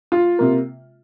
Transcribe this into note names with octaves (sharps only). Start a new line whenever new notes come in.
F4
C3 A#3